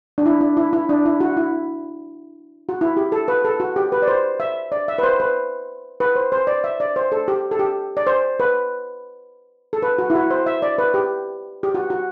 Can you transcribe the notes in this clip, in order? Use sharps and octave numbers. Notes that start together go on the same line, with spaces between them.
D4
E4
D4
E4
E4
D4
E4
F#4
E4
F#4
E4
G4
A4
B4
A4
F#4
G4
B4
D5
C5
E5
D5
E5
B4
C5
B4
B4
C5
C5
D5
E5
D5
C5
A4
G4
A4
G4
D5
C5
B4
A4
B4
F#4
E4
F#4
C5
E5
D5
B4
G4
G4
F#4
F#4